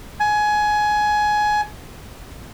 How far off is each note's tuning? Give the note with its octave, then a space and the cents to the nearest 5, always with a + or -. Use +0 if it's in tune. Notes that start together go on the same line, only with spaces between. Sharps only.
G#5 +20